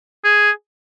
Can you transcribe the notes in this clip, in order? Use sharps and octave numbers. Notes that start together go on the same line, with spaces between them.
G#4